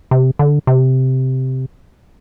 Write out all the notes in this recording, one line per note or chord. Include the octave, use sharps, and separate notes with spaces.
C3
D3
C3